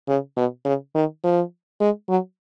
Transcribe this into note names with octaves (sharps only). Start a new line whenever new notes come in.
C#3
B2
C#3
D#3
F3
G#3
F#3